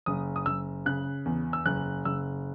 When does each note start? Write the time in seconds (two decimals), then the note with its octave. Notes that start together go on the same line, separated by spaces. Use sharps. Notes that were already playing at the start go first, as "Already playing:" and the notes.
0.06 F#1 D#6
0.36 D#6
0.46 F#1 E6
0.86 C#3 F#6
1.26 E2
1.53 E6
1.65 F#1 F#6
2.05 F#1 E6